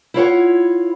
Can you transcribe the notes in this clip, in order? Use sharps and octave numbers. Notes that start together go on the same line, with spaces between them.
E4 F4 C#5 F#5